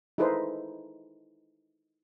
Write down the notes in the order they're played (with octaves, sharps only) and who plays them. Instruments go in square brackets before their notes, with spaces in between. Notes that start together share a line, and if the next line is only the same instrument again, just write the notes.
[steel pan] D#4 E4 G#4 A4 B4 C5